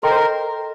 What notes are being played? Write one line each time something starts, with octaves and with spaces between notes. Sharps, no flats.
A4 A#4 D#5 G5 C6
C5
A#4